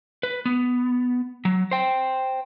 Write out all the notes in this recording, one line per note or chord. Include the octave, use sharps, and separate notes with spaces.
B4
B3
F#3
C5 G5